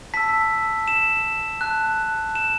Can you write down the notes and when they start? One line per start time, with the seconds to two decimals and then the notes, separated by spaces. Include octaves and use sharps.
0.14 A5 E6 B6
0.88 E7
1.61 A5 F#6
2.35 E7